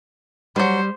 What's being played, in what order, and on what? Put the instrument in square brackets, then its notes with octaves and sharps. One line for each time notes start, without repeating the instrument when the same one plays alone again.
[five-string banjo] D#3 F#3 [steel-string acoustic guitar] G3 [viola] C5